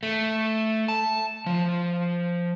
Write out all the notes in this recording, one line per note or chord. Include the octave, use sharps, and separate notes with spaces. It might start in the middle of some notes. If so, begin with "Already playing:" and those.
A3
A5
F3